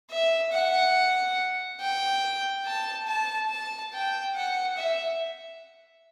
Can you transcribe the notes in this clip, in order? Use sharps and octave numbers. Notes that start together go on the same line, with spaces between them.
E5
F#5
G5
A5
A5
A5
G5
F#5
E5